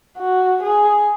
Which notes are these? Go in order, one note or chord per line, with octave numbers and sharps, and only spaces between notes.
F#4
G#4